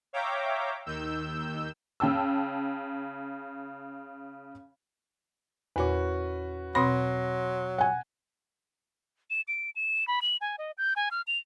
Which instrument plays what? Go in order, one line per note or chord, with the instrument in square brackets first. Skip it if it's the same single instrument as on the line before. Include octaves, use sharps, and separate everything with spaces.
[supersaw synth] C#5 E5 F5 G5 A#5 D6
D#2 D#3 E6 G6
[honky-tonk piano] C#3 G5 A5 E6
[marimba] E2 A#2 [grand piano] C#4 F#4 B4
[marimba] B2 C4 B5 [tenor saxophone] F#3 [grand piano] C6 A#6
[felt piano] F#5 G#5
[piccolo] E7
D7
E7
B5
F#7
G#5
D#5
G6
G#5
F6
F7